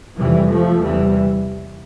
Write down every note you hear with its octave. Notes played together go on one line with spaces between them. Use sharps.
F2 C3 E3 G3
F3 A3
E2 C3 E3 G3